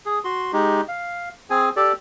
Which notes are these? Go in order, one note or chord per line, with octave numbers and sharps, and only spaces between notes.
G#4
F#4 C6
G#3 D#4 G4
F5
C4 G#4 G#5
G4 A4 D5